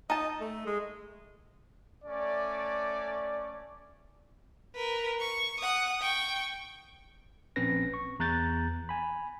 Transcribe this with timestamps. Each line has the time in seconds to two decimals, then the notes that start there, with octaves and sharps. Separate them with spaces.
0.10 D#4 D#5 A5
0.41 A3
0.66 G#3
2.05 A3 C#4 D5
4.75 A#4 B4
5.20 C#6
5.60 F#5 D#6
6.02 G5 C#6
7.56 A#1 C4 C#4 B4 A#6
7.94 C#6
8.19 E2 A#5 F#6 G6 A6
8.89 G#5 B5